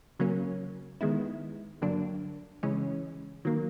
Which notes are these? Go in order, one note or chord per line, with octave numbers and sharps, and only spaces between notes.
C#3 F#3 A#3 C#4
D#3 G#3 B3 E4
G2 D3 F#3 A#3 D4
C#3 E3 G#3 C#4
D#3 F#3 A#3